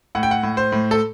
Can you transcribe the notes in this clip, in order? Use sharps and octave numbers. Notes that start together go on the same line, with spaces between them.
A2 F#5
G5
F#5
A2
C5
A2
A4